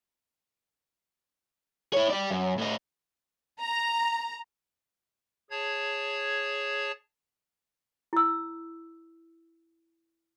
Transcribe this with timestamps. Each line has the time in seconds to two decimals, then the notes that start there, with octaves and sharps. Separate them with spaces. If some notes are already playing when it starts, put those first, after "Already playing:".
1.93 E4 C#5
2.10 G4 D5
2.31 F#2
2.58 A2 D#5
3.61 A#5
5.51 G#4 C#5 A5 G#6
8.13 E4 E6